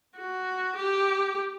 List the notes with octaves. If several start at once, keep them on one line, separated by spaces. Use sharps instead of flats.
F#4
G4